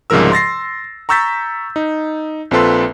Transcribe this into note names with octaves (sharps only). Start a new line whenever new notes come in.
C2 G#2 C#3 F3 A#4 E6
C6 A6 A#6 C7
A#5 C#6 E6 G6 A6 B6
D#4
A#1 C4 F4 A4 B4 C6